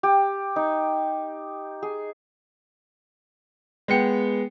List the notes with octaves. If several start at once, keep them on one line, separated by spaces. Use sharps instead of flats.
G4
D#4
G#4
G#3 B3 G5 C#7